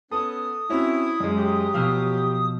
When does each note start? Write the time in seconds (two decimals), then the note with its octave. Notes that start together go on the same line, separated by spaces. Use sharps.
0.11 B3 C#4 A4 D#6
0.70 C4 C#4 E4 F#4
1.20 F#2 G#3
1.36 F#3 G4
1.74 B2 F3 F5 E6 F6